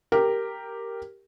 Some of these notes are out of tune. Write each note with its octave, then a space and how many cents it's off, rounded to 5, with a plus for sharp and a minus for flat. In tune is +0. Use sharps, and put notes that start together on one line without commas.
G4 +0 A#4 -5